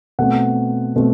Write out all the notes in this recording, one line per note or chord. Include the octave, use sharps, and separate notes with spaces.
B2 A3 C4 F#5
B2 A3 C4